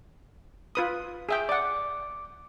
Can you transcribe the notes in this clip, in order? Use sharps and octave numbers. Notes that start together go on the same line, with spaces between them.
F4 B4 D#6
G#4 E5 G5
D5 F#5 D6